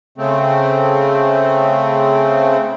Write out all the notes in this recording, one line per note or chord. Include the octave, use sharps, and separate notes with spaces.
C#3 A3 C4